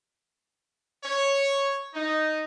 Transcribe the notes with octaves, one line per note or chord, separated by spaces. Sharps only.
C#5
D#4